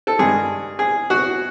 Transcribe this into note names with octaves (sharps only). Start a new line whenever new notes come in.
A4
G2 D#3 G#3 G#4
G#4
F#4